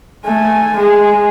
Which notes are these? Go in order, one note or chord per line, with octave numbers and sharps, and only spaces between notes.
A3 G#5
G#3 G#4